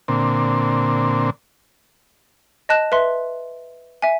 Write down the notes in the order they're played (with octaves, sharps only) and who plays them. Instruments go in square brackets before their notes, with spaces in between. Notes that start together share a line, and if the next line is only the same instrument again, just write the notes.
[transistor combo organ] A#2 D3 C4
[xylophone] D#5 A5 F#6 E7
B4 E5 C6
E5 G#5